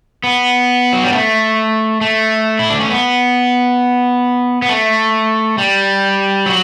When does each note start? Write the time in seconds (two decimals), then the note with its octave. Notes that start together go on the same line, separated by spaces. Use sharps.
0.24 B3
0.93 F#3
1.04 G3
1.13 A3
2.01 A3
2.59 E4
2.70 D4
2.80 C#4
2.91 B3
4.62 B3
4.69 A3
5.58 G3
6.46 F#3